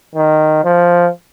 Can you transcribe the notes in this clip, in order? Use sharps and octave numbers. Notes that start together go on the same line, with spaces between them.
D#3
F3